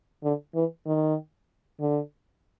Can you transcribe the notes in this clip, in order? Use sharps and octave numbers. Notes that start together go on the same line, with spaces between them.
D3
E3
D#3
D3